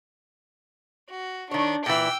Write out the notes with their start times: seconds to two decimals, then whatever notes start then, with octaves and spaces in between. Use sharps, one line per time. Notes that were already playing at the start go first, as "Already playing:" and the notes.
1.10 F#4
1.51 D#3 D4 C#5
1.86 A#2 E3 G5 E6